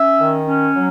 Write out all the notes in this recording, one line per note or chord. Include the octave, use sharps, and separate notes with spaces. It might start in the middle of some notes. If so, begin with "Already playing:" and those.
Already playing: C#4 E5
D#3
C#4
F#3